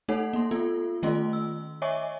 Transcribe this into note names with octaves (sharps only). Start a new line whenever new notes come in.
A3 D#4 A4 C#5 F#5
A#3 C6
B3 F4 A4
D#3 A3 C#4 F4 D#5 C6
E6
C#5 D#5 E5 G#5 C#6 D6